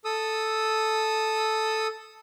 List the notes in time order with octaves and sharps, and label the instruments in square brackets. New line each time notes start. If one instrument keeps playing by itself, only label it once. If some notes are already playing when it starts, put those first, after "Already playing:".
[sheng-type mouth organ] A4 D#6 E6